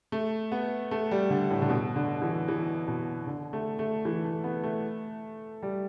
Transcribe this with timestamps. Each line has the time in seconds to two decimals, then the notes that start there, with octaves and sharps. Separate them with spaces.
0.12 A3
0.52 B3
0.91 A3
1.11 G3
1.30 D3
1.51 A2
1.62 D3
1.69 B2
1.96 D3
2.22 E3
2.48 E3
2.87 B2
3.27 D3
3.53 A3
3.79 A3
4.05 E3
4.24 A3
4.44 B3
4.63 A3
5.63 G3